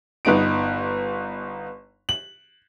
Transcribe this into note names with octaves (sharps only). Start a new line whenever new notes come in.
G1 B3 D#4 D7
F#7